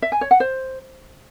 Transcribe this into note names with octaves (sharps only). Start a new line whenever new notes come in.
E5
G#5
C#5
F#5
C5